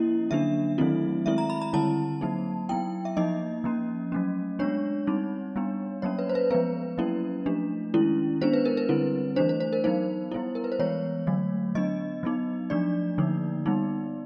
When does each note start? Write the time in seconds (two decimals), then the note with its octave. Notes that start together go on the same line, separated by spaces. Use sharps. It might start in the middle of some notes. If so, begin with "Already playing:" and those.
Already playing: F3 A#3 C#4 E4 D#5
0.31 D3 F#3 A#3 D4 E5
0.78 D#3 F#3 A3 C4 E4
1.26 D#3 G#3 C4 E4 E5
1.38 A#5
1.50 B5
1.61 A#5
1.73 D3 G3 C4 E4 A5
2.21 F#3 A#3 D#4
2.69 F#3 B3 E4 G5
3.05 E5
3.17 F3 A#3 D#4 D#5
3.64 F3 A#3 C#4
4.12 F#3 A3 C#4
4.59 G#3 B3 D4 C#5
5.07 G3 C4 D#4
5.56 G3 B3 D4
6.02 F#3 A#3 C#4 C#5
6.19 B4
6.29 C5
6.35 B4
6.51 F3 G#3 B3 B4
6.98 F#3 A#3 C#4 E4
7.46 F3 A3 D4
7.94 D#3 G#3 C#4 E4
8.41 G#3 B3 D4 C5
8.53 B4
8.65 A#4
8.77 B4
8.89 D3 G3 C4 E4
9.36 E3 A3 D4 C5
9.49 C5
9.60 C5
9.73 A#4
9.84 F#3 B3 D#4 C5
10.31 G3 B3 E4
10.55 A#4
10.64 B4
10.72 C5
10.79 E3 G#3 B3 C#5
11.27 D3 F#3 A3
11.75 F#3 B3 D4 D#5
12.23 F#3 B3 D#4
12.70 F3 A3 D4 D5
13.18 D3 F3 A#3 D#4
13.66 G3 B3 D#4